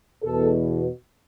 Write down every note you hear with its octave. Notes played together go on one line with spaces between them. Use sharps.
E2 B2 A4